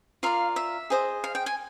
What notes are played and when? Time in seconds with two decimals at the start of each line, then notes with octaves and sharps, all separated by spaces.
0.23 F4 A#4 D5 F5
0.56 E5
0.90 G#4 C5 D#5
1.24 F5
1.35 G5
1.46 G#5